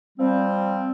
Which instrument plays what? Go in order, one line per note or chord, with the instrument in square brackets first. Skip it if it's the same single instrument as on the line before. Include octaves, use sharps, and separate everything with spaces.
[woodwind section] F3 G3 C4